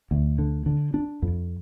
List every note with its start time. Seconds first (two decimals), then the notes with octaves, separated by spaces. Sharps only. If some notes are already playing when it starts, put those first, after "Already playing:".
0.11 D2
0.39 D3
0.66 D3
0.94 D4
1.22 F2